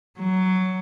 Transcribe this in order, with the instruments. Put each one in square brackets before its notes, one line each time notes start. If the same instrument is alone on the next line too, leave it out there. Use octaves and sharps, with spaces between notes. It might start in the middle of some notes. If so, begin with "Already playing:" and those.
[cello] F#3